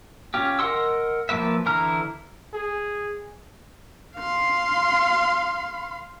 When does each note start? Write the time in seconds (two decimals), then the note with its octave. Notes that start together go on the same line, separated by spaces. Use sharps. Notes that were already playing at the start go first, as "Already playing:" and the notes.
0.34 C#4 F4 G4
0.59 A#4 D#5 F#5 C6 E6
1.29 F3 G3 A#3 B4 E5
1.66 D3 E3 E4 A#5 F6
2.54 G#4
4.16 F5 C6